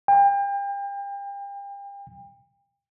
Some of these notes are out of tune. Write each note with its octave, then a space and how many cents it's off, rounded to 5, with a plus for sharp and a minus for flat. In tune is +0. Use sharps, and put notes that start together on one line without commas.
G5 +35